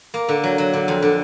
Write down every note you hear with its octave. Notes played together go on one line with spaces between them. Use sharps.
A#3
D3
F#3
F#3
D3
F2
D3